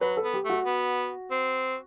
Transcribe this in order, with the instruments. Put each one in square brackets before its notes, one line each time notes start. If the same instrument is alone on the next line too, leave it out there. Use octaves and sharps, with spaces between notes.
[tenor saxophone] F#3 [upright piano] B4
[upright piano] A4
[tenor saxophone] B3
[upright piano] G4
[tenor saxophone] A3 [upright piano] F#4
[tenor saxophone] B3
C4